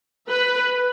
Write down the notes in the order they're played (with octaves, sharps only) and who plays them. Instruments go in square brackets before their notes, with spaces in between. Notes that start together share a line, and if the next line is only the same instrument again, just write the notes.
[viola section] B4